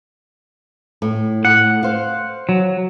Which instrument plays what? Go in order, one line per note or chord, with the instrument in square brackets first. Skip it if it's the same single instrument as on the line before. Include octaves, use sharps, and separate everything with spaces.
[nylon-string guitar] A2
[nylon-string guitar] A2 [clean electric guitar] F#5
[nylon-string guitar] C5 F5
[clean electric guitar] F#3